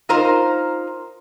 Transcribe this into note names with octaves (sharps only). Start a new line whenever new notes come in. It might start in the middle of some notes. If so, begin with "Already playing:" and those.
D#4 F4 A#4 C5